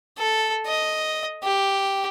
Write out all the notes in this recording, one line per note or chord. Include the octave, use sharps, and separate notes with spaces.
A4
D#5
G4